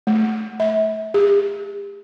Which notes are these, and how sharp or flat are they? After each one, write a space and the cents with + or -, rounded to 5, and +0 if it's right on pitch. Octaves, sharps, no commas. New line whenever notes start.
A3 -10
E5 -30
G4 +40